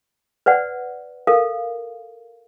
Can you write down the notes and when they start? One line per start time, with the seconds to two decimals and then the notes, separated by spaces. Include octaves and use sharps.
0.46 B4 C5 D5 F#5
1.27 A4 A#4 F5